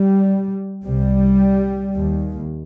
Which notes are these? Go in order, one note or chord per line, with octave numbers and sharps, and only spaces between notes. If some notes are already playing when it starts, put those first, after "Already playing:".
Already playing: G3
C2 C3 G3
D#2